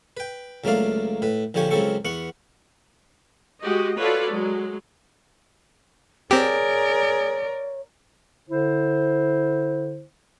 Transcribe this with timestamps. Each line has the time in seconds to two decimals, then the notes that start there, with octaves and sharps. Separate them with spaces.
0.17 B4 G5
0.64 C#2 F#3 A3 A#3 D5 F5
1.22 A2 B4
1.54 A#1 D3 F3 G4 C#5 G#5
1.71 C#2 C#3 F#3 C4 A4 C#6
2.05 E2 B3 F#5 C#6
3.61 G#3 F#4 G4 D#5
3.97 F4 F#4 A4 B4 C#5 D5
4.31 F#3 G#3
6.31 C4 G4 G#4 A#4 C#5 D5
8.49 D3 E4 C5